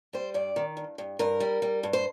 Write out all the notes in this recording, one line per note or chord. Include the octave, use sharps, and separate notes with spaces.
G3 C5
G2 D5
D#3
G2
G2
G2 A#4
G3
G3
G2
C5